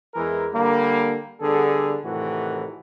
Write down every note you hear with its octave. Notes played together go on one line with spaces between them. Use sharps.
E2 E3 G#3 E4 A#4
D3 G3 A#3
D3 G3 B3 G#4 A4
A2 C3 D#3 E3 F#4